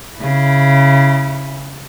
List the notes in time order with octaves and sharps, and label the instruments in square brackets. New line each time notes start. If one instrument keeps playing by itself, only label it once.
[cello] C#3 E4